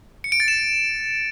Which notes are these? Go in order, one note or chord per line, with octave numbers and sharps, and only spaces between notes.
C#7
D7
A6
E7